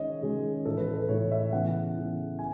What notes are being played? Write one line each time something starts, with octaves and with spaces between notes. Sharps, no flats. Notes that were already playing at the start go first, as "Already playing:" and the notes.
Already playing: D#3 G#3 C#4 C#5 D#5
D#3 G#3 C#4 G#4
A2 E3 A3 A4
B4
A4
B4
A2 E3 A3 C#5
E5
C#3 E3 B3 F#5
C#3 E3 B3
G#5